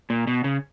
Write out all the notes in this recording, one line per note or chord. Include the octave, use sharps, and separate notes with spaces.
A#2
B2
C#3